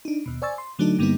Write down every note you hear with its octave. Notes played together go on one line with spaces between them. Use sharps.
D4 D#4
D#2 B2
C5 D5 G#5 C#6 E6 A6
C6
D3 F#3 A3 D4 D#4 A4
G2 D3 G3 A#3 B3 D#4